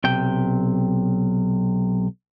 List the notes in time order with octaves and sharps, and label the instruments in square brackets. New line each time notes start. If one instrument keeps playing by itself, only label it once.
[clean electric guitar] B1 C3 G5